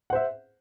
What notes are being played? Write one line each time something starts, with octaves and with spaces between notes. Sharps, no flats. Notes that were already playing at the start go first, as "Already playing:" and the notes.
C5 E5 F#5